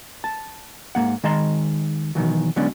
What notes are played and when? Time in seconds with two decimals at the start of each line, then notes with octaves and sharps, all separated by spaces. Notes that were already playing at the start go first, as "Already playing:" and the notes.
0.24 A5
0.95 G#2 D#3 A#3 F#5
1.23 D#3 G#3 D#5 A5 A#5 C6
2.15 B2 D#3 E3 F#3
2.56 D3 F#3 G#3 B3 C#4 D4